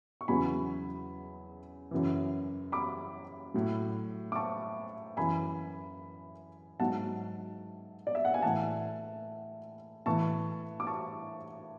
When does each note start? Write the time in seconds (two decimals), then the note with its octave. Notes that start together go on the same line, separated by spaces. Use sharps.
0.21 C#6
0.28 E2 C#3 F#3 G#5 B5
1.91 F#2 C#3 E3
2.72 B5 D6
3.54 A2 F#3
4.32 D6
4.35 A5 C#6
5.17 F#2 E3 G#5 B5
6.80 G#2 F#3 F#5 A5
8.07 D5
8.15 E5
8.25 F#5
8.34 G#5
8.42 A2 E3 F#5 A5
10.06 A2 E3 A5 C#6
10.80 D6
10.87 A5 C#6